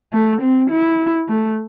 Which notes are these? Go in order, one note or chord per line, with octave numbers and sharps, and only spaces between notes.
A3
C4
E4
A3